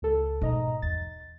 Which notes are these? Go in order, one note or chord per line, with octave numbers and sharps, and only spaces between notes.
C#2 A4
G#2 B2 D#5 A#5
E2 A6